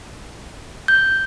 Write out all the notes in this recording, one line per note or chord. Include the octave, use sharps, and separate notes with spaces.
G6